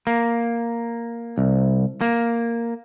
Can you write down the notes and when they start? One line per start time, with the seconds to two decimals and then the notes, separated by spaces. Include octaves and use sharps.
0.07 A#3
1.38 C2
2.01 A#3